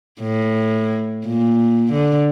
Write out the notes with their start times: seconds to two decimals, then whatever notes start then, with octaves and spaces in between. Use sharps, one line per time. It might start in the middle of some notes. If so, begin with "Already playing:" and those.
0.22 A2
1.26 A#2
1.93 D3